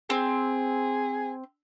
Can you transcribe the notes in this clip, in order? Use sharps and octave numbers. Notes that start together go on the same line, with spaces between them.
C4 G#4